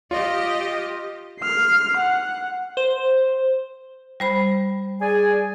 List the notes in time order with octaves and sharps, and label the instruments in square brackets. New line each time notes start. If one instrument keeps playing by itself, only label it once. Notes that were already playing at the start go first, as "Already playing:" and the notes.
[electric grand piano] F4 [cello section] G4 D#5
[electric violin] F6 C7
F#5
[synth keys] C5
[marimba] G3 C5 B5
[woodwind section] G#4 D5 G#5